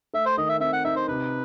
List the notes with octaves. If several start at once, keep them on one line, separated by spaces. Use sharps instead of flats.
A3 E5
C5
D#3 D#5
E5
C4 E5
F#5
D#4 E5
C5
C3 B4